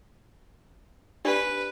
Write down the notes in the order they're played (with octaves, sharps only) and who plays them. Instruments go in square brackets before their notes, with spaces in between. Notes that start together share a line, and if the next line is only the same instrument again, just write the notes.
[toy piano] D4 G4 D5 [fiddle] B4